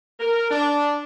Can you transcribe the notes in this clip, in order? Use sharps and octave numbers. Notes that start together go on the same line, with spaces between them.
A#4
D4